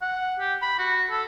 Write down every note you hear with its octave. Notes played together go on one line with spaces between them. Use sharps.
F#5
G4
B5
F#4
A4